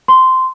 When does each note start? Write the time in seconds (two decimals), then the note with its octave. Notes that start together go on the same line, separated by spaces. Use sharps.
0.08 C6